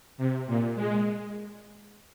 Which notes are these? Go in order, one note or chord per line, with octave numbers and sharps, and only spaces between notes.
C3
A#2
G#3